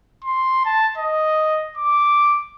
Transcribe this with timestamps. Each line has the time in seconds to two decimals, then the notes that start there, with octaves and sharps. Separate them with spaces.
0.25 C6
0.65 A5
0.98 D#5
1.78 D6